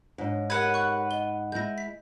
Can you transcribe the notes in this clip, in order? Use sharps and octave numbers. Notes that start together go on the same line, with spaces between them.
G#2 D4 C5 C#5
G4 A#4 B4 C#5 F#5 G#6
C#6 F#6
D#5 G7
G#3 E4 G6 A#6
B6